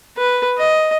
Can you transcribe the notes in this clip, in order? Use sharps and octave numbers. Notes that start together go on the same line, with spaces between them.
B4
D#5